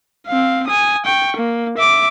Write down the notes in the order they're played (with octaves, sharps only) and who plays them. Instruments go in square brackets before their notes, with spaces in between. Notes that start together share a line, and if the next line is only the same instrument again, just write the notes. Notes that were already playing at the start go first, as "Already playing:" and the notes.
[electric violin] C4 F5
G#5 D#6
G5 C#6
A#3
E5 D6